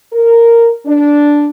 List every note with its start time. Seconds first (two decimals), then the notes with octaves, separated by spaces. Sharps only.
0.13 A#4
0.86 D4